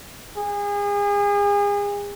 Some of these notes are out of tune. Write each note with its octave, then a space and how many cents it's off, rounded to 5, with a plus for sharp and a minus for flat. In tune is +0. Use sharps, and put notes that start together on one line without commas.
G#4 -35